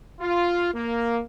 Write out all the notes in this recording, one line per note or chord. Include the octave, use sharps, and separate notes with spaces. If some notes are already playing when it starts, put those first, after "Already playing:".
F4
A#3